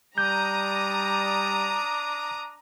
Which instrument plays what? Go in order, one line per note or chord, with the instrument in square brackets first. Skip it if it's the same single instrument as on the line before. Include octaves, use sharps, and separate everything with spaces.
[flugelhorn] G3 [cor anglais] D4 [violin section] A#5 D#6 [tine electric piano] G6